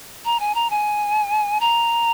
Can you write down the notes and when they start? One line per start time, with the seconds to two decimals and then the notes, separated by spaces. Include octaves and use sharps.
0.25 A#5
0.40 G#5
0.55 A#5
0.70 G#5
1.60 A#5